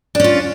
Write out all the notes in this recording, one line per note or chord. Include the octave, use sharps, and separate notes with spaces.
C#4 D4 F4